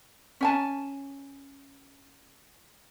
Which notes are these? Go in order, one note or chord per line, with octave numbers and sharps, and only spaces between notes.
C#4 G#5 A5